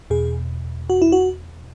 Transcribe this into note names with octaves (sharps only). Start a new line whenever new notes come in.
E2 B2 G#4
F#4
E4
F#4